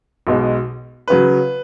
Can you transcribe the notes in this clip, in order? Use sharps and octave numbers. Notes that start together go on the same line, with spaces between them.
B1 B2 G#3
C#3 F#3 B4